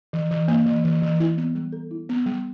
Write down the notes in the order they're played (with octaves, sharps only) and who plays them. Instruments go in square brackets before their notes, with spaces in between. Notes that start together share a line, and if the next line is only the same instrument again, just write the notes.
[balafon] E3
E3
A#3
E3
E3
E3
E4
B3
G3
A4
E4
B3
G3